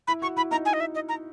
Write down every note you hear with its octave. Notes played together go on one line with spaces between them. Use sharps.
E4 B5
F#4 C#6
E4 B5
D#4 A#5
G#5
D#5
E5
D#5
A#5